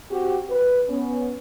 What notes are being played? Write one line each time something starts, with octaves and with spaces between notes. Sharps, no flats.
C4 F#4 G4
B4
B3 C#4